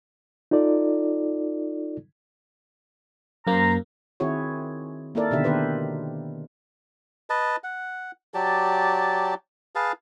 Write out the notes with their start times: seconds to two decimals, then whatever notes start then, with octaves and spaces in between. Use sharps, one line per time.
0.51 D#4 F4 A4 D5
3.47 F#2 A#3 C5 A#5
4.20 D#3 C4 E4 F#4 G#4 C#5
5.15 A#3 D#4 E4 A4 A#4 D5
5.31 B2 D3 D#3 G4 E5
5.44 D#3 A#3 G4 B4 C5
7.30 B4 D#5 A5
7.64 F#5
8.34 F#3 G4 D5 A5
9.75 G#4 B4 F5 A5